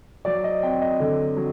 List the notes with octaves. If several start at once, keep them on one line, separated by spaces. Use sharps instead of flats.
F#3 D5
D#5
C4 G5
D#5
D3
F#3